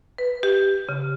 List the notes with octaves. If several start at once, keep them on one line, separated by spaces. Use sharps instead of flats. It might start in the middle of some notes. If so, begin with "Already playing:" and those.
B4
G4
C#3